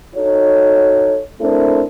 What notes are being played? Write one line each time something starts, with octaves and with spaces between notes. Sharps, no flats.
D#4 F#4 A4 C#5
A3 C4 D4 E4 A4 A#4